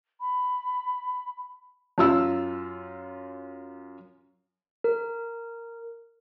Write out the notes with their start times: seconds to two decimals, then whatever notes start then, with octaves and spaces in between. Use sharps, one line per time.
0.21 B5
1.98 F#2 F4 E6
4.84 A#4